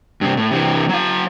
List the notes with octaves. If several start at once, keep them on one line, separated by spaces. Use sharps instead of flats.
G2 C3
A2
C3 E3
F#3 F5